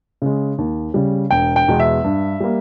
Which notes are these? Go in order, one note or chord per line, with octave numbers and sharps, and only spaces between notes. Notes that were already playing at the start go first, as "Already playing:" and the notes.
C#3 G#3
D#2
C#3 G3
E1 G5
G5
E2 B2 G#3
E5
G2
G3 A#3